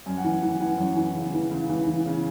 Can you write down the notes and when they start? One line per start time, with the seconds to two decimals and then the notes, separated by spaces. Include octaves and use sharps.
0.06 F#2 G#5
0.17 F#5
0.24 E3 G#5
0.43 E3
0.53 G#5
0.60 E3 F#5
0.78 F#2
0.97 E3
1.14 C#3
1.33 E3
1.51 C#2
1.70 E3
1.87 E3
2.06 C#3